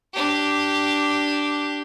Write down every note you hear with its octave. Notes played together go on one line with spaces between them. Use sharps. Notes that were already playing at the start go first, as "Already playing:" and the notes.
D4 G4